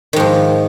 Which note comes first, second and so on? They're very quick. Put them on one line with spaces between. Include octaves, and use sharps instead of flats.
D#3 G#2 F3